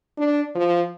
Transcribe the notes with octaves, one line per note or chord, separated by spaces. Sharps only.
D4
F3